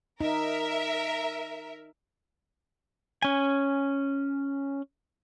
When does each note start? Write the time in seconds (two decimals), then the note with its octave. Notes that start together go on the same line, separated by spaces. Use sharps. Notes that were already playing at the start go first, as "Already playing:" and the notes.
0.21 D#4 A#4 E5
3.22 C#4 G#5